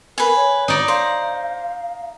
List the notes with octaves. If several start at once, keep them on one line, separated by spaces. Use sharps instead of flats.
A#4 B4 G#5
C#5
D#4 D5
C5 F5